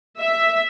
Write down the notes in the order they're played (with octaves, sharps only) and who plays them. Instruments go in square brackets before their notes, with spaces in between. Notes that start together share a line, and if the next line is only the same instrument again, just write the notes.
[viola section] E5